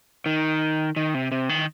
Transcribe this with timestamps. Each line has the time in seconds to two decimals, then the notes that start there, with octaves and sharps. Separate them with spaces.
0.26 D#3
0.96 D#3
1.14 C3
1.32 C3
1.49 D#3